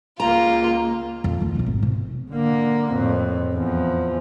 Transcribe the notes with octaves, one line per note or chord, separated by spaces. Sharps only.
C#2 A#3 F4 A#5
F2
D2 D#3
B1 F2
G#1
C3
D3 A#3
F2 A2
E2 F3